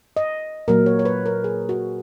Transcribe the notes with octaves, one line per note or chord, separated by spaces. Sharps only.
D#5
A#2 F#3 A#3 A#4
C#5
C#5
B4
A#4
G#4
F#4